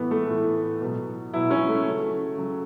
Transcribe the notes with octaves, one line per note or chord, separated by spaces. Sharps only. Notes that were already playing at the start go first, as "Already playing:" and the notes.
Already playing: A2 E3 B3
A3
A2 E3
B2 F#3
B2 F#3 E4
C#4
A3
C#3 F#3
C#3 F#3